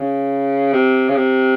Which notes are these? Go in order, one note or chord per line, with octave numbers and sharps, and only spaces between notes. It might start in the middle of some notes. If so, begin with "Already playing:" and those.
Already playing: C#3
C3
C#3
C3